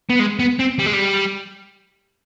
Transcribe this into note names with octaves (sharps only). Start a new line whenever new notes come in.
B3
G#3
B3
C4
G3
G#3
G3